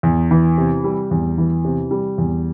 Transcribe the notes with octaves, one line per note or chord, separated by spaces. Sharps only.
E2
E3
C3
G3
E2
E3
C3
G3
E2